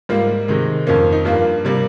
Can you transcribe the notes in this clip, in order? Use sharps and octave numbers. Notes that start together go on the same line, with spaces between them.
G#2 G3 A#3 F4
C3 D#3 G#3
F2 D#3 A#3 C#4
D#4
G2 G3 A#3 F4
C3 G3 A#3